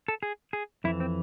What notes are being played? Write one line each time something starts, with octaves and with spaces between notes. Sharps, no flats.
A4
G#4
G#4
F2 E3 E4
C4